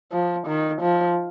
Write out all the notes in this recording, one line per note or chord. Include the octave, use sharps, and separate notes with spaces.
F3
D#3
F3